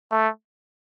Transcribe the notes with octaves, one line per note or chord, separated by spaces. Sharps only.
A3